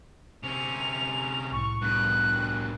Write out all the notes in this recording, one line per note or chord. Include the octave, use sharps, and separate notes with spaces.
C3 C#4 F7
C2 A2 C#6
G2 B2 F#6